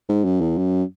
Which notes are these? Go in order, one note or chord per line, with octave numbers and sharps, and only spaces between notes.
G#2
F#2
E2
F#2